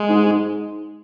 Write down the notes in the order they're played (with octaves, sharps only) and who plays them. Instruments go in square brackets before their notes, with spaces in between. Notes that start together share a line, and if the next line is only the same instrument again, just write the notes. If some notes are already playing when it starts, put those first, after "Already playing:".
Already playing: [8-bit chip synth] G#3
[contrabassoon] G#2
G#2